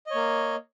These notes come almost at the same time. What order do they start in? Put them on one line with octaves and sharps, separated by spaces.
D#5 C#5 A#3